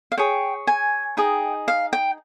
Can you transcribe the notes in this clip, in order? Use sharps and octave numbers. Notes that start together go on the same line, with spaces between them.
F5
G#4 C#5 G5
G#5
D#4 G#4 D#5 G5
F5
G5